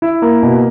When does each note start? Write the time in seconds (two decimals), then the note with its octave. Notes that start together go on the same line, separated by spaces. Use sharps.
0.02 E4
0.22 A#3
0.43 B2